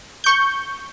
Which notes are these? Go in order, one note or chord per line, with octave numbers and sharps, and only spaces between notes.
C#6 G6